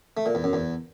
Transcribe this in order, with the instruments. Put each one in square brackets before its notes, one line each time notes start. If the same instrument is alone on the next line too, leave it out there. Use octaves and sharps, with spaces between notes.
[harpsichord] A3
A#2
E2
F#2
E2